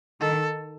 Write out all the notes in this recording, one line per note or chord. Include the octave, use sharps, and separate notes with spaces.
D#3 A4